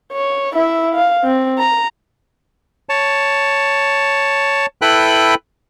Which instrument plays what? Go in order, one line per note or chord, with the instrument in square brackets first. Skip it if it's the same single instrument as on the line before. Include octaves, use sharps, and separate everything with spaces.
[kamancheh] C#5
E4 E5
F5
C4
A#5
[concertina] C#5 A5
E4 A4 B4 G5 B5 F#6